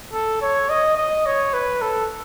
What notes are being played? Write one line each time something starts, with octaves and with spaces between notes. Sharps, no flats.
A4
C#5
D#5
D#5
C#5
B4
A4